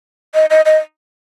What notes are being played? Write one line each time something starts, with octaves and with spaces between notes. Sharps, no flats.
D#5
D#5
D#5